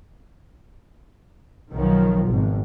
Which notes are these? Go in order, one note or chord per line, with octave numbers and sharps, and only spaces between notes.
B1 D#3 F3 F#3
G#1 B2